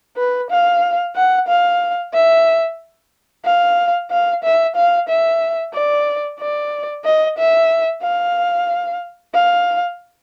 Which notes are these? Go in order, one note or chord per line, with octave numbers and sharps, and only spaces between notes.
B4
F5
F#5
F5
E5
F5
F5
E5
F5
E5
D5
D5
D#5
E5
F5
F5